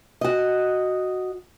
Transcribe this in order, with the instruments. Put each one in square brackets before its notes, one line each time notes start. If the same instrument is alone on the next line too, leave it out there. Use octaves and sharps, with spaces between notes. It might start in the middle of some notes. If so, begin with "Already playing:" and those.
[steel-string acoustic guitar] F#4 D#5